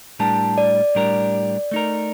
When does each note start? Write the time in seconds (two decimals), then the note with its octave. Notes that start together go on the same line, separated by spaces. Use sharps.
0.19 A2 G3 D4 G4 A#4 A5
0.58 D5
0.95 A2 G3 D4 G4 A#4
1.71 A3 D#4 A#4